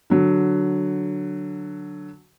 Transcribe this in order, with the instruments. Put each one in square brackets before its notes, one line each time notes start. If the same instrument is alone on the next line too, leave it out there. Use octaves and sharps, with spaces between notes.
[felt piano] D3 F#3